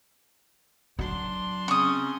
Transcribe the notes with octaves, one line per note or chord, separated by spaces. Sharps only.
F#3 D4 C6
C#3 C4 C#4 C#6 D#6